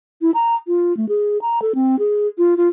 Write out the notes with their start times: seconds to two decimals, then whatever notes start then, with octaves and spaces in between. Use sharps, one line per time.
0.22 E4
0.34 A#5
0.67 F4
0.97 A3
1.09 G#4
1.42 A#5
1.62 A4
1.75 C4
1.99 G#4
2.38 F4
2.57 F4